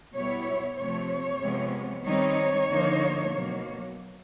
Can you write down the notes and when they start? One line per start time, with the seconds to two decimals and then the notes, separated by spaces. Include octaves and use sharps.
0.14 B2 G3 B3 E4 C#5
0.77 C3 F3 A3 C4 C#5
1.41 C3 F3 G#3 B3
2.04 D#3 G3 C4 D#4 C#5
2.68 D3 F3 A#3 D#4
3.30 B2 F#3 A#3